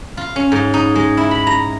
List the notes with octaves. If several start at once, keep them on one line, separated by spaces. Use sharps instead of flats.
F4
C#4
G#2
D#4
G#3
E4
B5
A#5